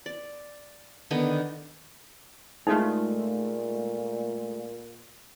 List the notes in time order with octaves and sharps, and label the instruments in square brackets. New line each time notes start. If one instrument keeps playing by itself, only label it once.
[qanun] D5
D3 D#3 B3 D#4
[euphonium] A#2 [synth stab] G#3 A3 F4 [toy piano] D#4